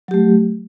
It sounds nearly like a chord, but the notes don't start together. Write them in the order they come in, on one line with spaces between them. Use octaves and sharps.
F#3 G4 A3